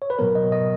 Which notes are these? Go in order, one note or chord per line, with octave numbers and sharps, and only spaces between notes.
C#5
B4
B2 F#3 B3 A#4
D#5
D#5